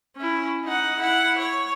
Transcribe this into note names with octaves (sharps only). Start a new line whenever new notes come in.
C#4 E4
D#4 F#5
E4 F#5
C#5